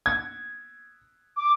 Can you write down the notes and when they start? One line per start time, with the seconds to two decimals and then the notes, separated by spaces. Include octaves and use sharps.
0.06 G#6
1.37 D6